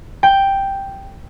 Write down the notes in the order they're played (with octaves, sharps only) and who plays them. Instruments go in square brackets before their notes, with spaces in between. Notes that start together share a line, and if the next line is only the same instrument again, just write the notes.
[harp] G5